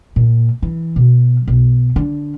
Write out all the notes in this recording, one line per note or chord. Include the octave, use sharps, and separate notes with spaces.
A#2
E3
B2
B1
D3